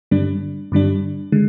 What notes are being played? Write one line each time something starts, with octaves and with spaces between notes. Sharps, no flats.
G2 D3 G3 D4
G2 D3 G3 D4
D3 G#3